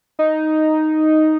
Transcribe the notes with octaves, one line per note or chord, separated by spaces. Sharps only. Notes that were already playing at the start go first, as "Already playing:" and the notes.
D#4